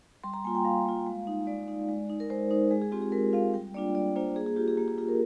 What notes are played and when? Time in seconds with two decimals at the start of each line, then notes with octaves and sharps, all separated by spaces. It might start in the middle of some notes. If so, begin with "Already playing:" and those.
0.24 G3 C6
0.34 A#5
0.44 A#3 F4 G#5
0.55 G5
0.64 G3 F5
0.86 A#3 F4
1.07 G#3
1.27 D#4
1.47 G#3 D5
1.68 D#4
1.89 G#3
2.10 D#4
2.20 A#4
2.30 G#3 C5
2.51 D#4 C5
2.71 G#3 G#4
2.82 G#4
2.92 C4 F4 G4
3.02 G#4
3.12 G#3 A#4
3.33 C4 F4 F5
3.54 G3 G5
3.74 A#3 D4 F4 D5
3.95 G3 D5
4.16 A#3 D4 F4 C5
4.36 A#3 G#4
4.46 G#4
4.57 F4 G4
4.68 G#4
4.77 A#3 G4
4.88 G#4
4.98 F4 G#4
5.08 A#4